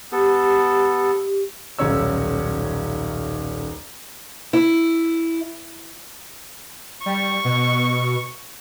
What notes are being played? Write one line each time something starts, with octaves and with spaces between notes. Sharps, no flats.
B3 G4 A4
D#1 B1 C#4 C#5 E6
E4
G3 C#6
B2